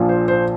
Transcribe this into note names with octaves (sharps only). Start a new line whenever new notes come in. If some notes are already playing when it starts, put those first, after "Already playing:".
Already playing: A#1 A#2 F3
C5
C5